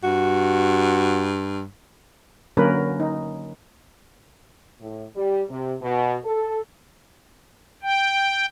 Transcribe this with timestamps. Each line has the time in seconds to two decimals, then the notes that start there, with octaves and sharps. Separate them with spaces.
0.04 G2 F#4
2.57 D3 F#3 A#3 C#4 A#4 B4
3.00 D#4
4.81 A2
5.16 G3
5.49 C3
5.82 B2
6.24 A4
7.83 G5